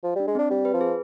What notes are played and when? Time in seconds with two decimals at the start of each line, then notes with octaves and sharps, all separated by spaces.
0.03 F3
0.15 G3 D4
0.27 G#3
0.35 C4
0.39 D4
0.50 G3 C4
0.65 B4
0.73 F3
0.81 G#4